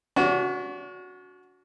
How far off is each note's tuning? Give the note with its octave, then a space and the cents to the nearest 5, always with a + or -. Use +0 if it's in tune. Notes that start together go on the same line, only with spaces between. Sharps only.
D4 -45 F#4 -10